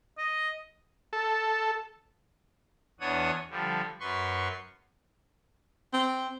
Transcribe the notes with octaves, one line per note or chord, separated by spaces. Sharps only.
D#5
A4
E2 B3 D4 C#5 F#5 D#6
D3 F3 G3
F#2 B4 C6 C#6
C4